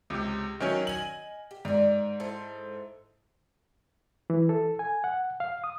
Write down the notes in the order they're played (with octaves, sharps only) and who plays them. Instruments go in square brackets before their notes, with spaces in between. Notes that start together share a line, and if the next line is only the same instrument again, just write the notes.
[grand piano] C#2 C3
D#3 F#3 C#4
[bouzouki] D#5 G#5 [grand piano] F#7
[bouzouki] G4
[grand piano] G#2 [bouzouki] A#4 D5
[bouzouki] E4 A4 C5
[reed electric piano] E3
A4
G#5
F#5
F5
D#6